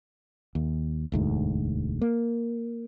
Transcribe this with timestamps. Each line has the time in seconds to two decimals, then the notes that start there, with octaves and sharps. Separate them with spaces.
0.55 D#2
1.12 E1 D2 G#2
2.01 A#3